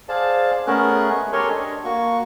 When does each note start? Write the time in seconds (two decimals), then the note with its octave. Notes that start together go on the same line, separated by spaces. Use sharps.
0.09 G#4 C5 D5 F5 A5
0.67 A3 B3 C#4 G#4 A#4 F#6
1.11 G#3
1.33 G4 A4 A#4 C#5 G#5 C6
1.50 D4 D#5
1.84 A#3 F#4 C#6